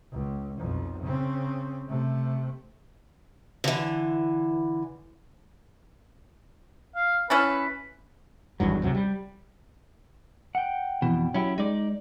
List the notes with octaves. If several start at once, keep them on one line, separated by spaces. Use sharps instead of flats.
C#2
B1 F2
C#3 C4
C3 A3
D3 E3
F5
C#4 E4 A4 B4
G#1 E2 G2 F#3
C#2 C3 F#3
G3
F#5 G5
F2 B2 E3
F#3 C#4 E4 G4
G#3 D#4 D5